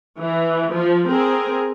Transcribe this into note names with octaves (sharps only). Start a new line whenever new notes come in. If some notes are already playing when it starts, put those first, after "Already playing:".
E3
F3
C4 G#4 A#4